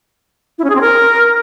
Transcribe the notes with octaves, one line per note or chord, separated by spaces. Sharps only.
E4
C#4
G#4
C4
A#4